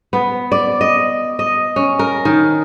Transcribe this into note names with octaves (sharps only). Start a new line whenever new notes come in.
B3
D5
D#5
D#5
C#4
A#4
D#3